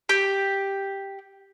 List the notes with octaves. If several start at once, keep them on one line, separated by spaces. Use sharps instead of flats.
G4